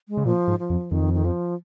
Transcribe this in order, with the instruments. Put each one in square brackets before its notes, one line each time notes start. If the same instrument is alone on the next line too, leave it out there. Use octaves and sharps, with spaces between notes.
[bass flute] G#3
[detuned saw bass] C#3
[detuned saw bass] A#2 [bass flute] F3
[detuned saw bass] G#2
[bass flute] F3
[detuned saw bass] F2
[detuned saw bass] F2 [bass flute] D#3
[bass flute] D#3
F3